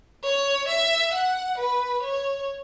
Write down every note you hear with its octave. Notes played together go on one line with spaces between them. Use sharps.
C#5
E5
F#5
B4
C#5